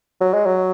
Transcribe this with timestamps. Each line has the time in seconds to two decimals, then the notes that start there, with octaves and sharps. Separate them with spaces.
0.21 F#3
0.34 G#3
0.46 F#3